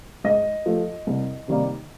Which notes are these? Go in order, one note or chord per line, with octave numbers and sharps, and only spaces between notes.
G#2 D#5
F3 A3
C2
C3 D#3 G3 A#3